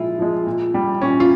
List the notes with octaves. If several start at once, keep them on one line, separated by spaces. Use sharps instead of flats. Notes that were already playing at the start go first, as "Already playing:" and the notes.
Already playing: A#2 F3 G#3 E4 F4
F3 G#3
A#2
G3
A#2 C#4
F4